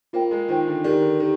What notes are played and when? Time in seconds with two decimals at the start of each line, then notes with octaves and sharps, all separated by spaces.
0.13 A#3 F4 C5 G5
0.31 G#3
0.48 D#3 F4 C5 G5
0.67 D3
0.84 D#3 D4 G4 D5
1.02 D3
1.19 D#3 D4 G4